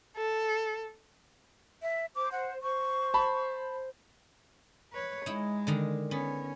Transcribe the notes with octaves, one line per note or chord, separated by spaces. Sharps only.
A4
E5
C5 D6
F#5
C5 C#6
A5 B5
B4 C#5
G#3 D#4 E4
D3 D#3 A#5
B3 C#4